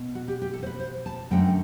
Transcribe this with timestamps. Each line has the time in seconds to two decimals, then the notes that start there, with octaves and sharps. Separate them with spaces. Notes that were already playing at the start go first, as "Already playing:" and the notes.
Already playing: B2
0.15 F#4
0.28 G4
0.42 G4
0.53 A4
0.63 C5
0.66 B4
0.80 C5
1.06 A5
1.31 F#2 D3 A3 G5